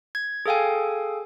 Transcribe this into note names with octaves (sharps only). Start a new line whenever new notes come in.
G#6
G#4 A4 F5 G5 G#5